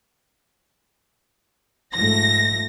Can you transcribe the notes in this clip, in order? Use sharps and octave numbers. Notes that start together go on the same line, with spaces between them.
G#2 F3 A3 A#6